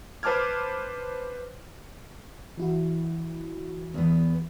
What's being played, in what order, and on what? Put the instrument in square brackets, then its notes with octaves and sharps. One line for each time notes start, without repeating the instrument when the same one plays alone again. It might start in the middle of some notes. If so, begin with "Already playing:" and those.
[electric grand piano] B4 C5 A5 D6 F6 G#6
[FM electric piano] E3 E4 F#4
[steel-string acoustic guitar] E2 B3